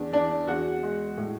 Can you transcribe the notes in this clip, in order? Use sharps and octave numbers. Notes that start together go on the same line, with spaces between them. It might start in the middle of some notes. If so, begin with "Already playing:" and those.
Already playing: E2 D4
E3 D4 D5
E2 F#4 F#5
G#3
A2